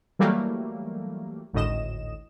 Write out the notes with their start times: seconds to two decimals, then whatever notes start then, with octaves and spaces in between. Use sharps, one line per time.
0.19 E3 F#3 G3 A3 A#3
1.53 G#1 D2 A2 D#5 E7